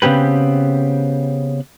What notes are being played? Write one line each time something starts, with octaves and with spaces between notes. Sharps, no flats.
C#3 B3 C4 G4 B4